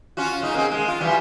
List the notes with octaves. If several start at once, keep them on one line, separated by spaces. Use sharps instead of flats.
C#4 F4 F#4
C#3 F#3 D#4
A#3 C4 G#4
G#3
F4
E3 F#3 G3